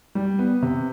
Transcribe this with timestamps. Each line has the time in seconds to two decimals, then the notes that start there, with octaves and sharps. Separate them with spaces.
0.15 G3
0.39 B3
0.62 C3